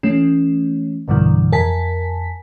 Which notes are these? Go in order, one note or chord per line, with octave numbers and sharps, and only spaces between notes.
E3 A3 C#4
B1 G2 B2 D3 E3
F2 A#4 G#5 A5 B6